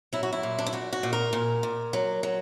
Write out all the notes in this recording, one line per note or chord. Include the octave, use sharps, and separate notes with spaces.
F#3 E4
F#4
E4
A#2
D4
E4
A#2 F#4
F#4
A#2
A#4
A#2
A#2
F#3
F#3